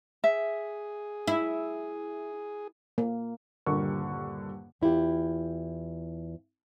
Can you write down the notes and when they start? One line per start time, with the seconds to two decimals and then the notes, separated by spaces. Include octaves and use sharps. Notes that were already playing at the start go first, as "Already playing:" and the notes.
0.24 G#4 E5
1.27 E4
2.98 A#3
3.66 D#1 G2 D3 A#4 C#6
4.81 E2 E4 F4 G4